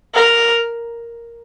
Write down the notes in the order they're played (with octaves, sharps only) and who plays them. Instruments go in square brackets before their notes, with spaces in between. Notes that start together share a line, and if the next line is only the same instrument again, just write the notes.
[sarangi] A#4